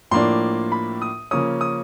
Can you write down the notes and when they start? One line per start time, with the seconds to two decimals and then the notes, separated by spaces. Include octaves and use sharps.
0.11 A2 F3 A#3 D4 C6
0.72 B5
1.02 D#6
1.31 C#3 F3 A#3 C#4 D#6
1.61 D#6